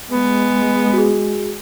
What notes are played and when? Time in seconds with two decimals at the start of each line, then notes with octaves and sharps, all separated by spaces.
0.10 G#3 B3
0.93 F#4 G#4